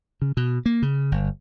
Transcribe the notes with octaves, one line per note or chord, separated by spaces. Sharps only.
C#3
B2
A#3
C#3
G1